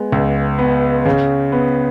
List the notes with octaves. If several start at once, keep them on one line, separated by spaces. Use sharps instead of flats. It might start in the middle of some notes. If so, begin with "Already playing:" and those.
Already playing: G#3 B3
C#2
B3
C#3
B3